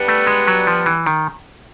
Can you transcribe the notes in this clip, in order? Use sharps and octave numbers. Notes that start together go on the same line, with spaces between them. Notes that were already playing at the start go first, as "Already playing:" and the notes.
Already playing: G3 B3 D4
A3
G#3
F#3
F3
E3
D#3